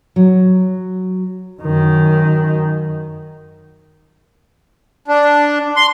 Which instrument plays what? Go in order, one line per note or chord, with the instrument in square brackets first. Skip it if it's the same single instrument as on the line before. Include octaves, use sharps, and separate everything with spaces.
[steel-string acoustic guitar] F#3
[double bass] F#2 D#3
[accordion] D4
C6